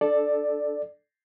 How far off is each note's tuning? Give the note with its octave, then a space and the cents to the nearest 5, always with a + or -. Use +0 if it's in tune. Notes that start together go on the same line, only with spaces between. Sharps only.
D4 +0 A4 -5 D5 +10